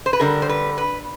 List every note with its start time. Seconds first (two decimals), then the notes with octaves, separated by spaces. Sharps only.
0.06 C5
0.13 B4
0.20 D3 G3 A#4
0.42 C5
0.49 B4
0.78 B4